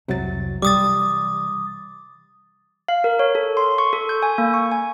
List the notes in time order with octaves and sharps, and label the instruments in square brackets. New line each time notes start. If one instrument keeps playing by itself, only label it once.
[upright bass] C2 F2 [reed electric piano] C3 F#3 A6
[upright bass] C3 E3 [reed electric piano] G3 [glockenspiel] D6 D#6 A6
[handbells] F5
A#4
C#5
A4
C6
C#6
A4
G6
G#5
A#3
C#6
G#5